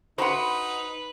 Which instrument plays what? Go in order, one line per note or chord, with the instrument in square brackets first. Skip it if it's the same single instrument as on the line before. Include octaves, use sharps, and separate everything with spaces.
[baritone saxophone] D#4 [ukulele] F#4 B5 [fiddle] B4 [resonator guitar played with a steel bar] C5 F#5